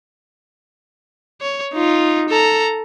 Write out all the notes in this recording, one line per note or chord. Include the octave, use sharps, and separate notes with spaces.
C#5
D#4 F4
A4 A#5